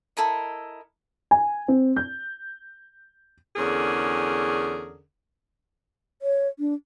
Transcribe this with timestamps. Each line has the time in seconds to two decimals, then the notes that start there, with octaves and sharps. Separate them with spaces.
0.17 E4 A4 A#4 D#5
1.31 G#5
1.68 C4
1.96 G6
3.56 E2 D3 C#4 G#4 A#4
6.22 C#5
6.59 D4